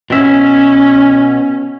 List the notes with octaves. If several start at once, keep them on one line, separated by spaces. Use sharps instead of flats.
B2 C#4 E5